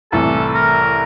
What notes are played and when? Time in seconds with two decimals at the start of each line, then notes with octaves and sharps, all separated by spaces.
0.12 C2 A2 E3 A4
0.55 A#4